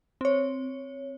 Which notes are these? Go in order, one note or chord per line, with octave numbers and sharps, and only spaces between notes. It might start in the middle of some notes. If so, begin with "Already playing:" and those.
C4 C#5